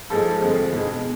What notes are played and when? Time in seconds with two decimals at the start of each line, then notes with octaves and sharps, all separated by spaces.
0.10 G#2 F3 G#3 A4
0.41 F2 D3 F3 G#3
0.73 B2 G#3